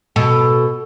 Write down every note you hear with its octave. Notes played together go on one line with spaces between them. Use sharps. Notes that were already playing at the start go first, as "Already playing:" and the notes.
B2 A4